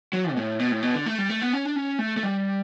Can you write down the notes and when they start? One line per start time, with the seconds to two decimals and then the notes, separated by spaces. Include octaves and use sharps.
0.13 F#3
0.32 B2
0.37 A2
0.59 B2
0.72 A2
0.83 B2
0.95 D3
1.06 A3
1.18 G3
1.30 A3
1.42 B3
1.53 C#4
1.65 D4
1.76 C#4
1.99 A3
2.17 A3
2.23 G3